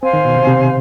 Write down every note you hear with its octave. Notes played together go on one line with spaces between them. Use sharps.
C4 C5 F5 G#5
D#3
B2
C3
C3